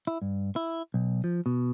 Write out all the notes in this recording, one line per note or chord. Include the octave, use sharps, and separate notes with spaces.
E4
G2
E4
B1
F3
B2